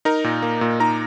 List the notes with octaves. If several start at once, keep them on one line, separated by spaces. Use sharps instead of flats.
D#4 A#4 A#5
A#2
A#3
A#2
D#4 A#4 A#5